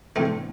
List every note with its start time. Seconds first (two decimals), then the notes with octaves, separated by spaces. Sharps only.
0.16 A2 E3 A3 B3 C4 D4